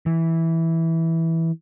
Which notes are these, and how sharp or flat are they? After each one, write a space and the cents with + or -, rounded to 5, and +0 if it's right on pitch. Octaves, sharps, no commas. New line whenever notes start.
E3 -10